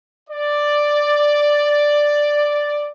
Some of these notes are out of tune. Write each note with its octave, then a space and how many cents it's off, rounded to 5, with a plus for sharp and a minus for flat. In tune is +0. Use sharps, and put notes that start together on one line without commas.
D5 +5